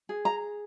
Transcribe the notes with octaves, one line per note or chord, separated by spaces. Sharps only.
G#4
A#5